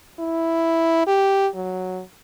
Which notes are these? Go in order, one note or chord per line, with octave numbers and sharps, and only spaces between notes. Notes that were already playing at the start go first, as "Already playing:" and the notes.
E4
G4
F#3